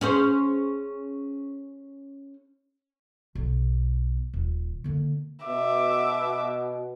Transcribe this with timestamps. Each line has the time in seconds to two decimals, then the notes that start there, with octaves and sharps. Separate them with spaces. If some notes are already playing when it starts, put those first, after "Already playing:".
0.01 C#4 G#4 C5
3.35 B1
4.34 D#1
4.84 D3 A#3
5.45 B2 E5 D6